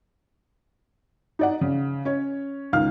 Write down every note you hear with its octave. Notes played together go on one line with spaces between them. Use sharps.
D#4 D5 F#5
C#3
C#4 C#5
C#2 D#3 F5 F6